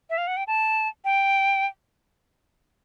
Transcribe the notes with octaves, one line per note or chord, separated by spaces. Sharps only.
E5
F5
F#5
G5
A5
G5